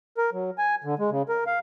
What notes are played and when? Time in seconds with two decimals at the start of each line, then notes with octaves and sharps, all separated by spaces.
0.18 A#4
0.33 F#3
0.58 G#5
0.84 D3
0.99 G#3
1.11 C#3
1.29 A#4
1.47 F5